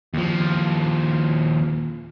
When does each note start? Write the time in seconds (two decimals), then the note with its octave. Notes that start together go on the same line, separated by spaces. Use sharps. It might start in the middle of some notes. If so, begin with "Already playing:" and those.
0.14 D#2 F3